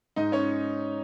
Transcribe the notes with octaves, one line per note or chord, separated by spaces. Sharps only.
G#2 D#4 D#5
C#4 C#5